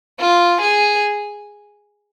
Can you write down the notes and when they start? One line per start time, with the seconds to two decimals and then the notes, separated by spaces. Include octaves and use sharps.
0.19 F4
0.61 G#4